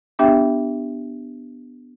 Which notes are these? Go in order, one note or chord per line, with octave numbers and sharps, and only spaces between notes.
B3 D4 G4 E5 G5